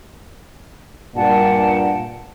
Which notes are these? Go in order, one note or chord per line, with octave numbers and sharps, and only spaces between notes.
G2 A#2 F#5 G5 A5